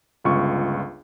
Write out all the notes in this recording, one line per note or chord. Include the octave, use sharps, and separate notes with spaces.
G1 C#2 F4 C#6